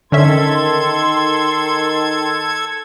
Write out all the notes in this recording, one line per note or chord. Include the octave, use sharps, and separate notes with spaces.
D3 D#3 C#4 A4 E5 C6 G#6